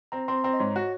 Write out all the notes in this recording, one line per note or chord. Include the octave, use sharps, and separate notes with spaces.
C4 A#5
C4 C6
C4 A#5
D#5
G#2 C#5
F#4